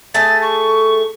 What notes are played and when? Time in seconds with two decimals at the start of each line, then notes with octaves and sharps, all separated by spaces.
0.14 A3 G#4 A4 A6
0.42 C#6